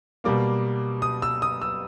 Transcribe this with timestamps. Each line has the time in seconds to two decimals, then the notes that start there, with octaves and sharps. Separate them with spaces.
0.24 B2 G3 A#3 D6
1.02 D#6
1.22 E6
1.42 D#6
1.62 E6